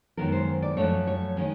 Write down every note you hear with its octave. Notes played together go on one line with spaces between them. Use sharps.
F#2 D#3 G#3 B3 A#4
C5
D5
F#2 D3 F3 A3 C#5
C#5
D#3 G#3 C#4